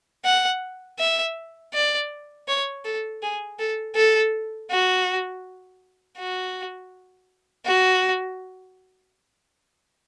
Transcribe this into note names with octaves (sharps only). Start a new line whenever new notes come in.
F#5
E5
D5
C#5
A4
G#4
A4
A4
F#4
F#4
F#4